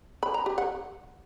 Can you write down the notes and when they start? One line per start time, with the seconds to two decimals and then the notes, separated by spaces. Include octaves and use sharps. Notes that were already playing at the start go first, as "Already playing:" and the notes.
0.23 B5
0.34 A#5
0.46 G4
0.58 F#5